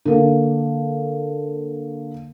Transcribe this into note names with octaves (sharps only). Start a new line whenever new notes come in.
D3 A#3